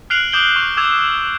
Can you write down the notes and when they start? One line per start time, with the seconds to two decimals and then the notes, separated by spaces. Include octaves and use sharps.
0.10 F6 F#6 C7 D7 F7 F#7
0.32 D6 D#6 G6 D7 F#7 G7
0.56 C#6
0.77 D6 E6 G#6 E7 F7